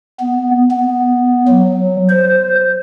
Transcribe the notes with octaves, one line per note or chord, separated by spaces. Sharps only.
B3
B3
F#3
C5